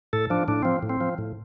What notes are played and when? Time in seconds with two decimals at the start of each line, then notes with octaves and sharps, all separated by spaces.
0.13 A2 A4
0.30 F3 D4
0.48 A2 D4
0.63 F3 C4
0.83 A2
0.90 C4
1.01 F3
1.18 A2